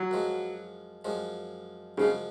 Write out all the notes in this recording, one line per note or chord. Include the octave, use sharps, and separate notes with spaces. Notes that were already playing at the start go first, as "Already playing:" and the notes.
Already playing: F#3
F#2 F3 G#3
F#2 F3 G#3
F#2 C#3 F3 G#3